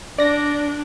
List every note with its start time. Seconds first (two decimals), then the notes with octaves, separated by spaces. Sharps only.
0.18 D4 D5 A#6